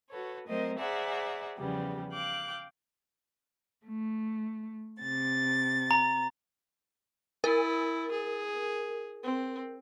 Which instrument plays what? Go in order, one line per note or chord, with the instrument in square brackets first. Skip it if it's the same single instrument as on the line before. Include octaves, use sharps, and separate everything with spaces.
[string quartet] F#4 A4 B4 C#5
F#3 A3 C4 A#4 C5 D#5
G#4 C5 D5 E5 F#5 A#5
E2 C#3 F3 G3 B3 G4
F5 G5 D6 F#6
A3
C3 A6
[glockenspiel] A#5
[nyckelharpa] E4 [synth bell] A#4
[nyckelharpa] G#4
C4